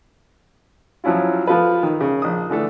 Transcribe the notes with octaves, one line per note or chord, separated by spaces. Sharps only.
F3 F#3 C#4 E4 F4
F3 F4 A4 B4
D#3
C#3
A#1 D#6
D3 E3 A3 A4